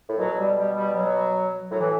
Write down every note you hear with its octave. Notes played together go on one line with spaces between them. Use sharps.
A2
B2 F#3
G3
G3
G3
F#3
A2 F#3
E3